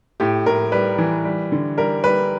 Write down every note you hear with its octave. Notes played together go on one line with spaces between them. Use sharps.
A2 G4
A2 A#4
G3 B4
E3
G3
D3
G3 A#4
G3 B4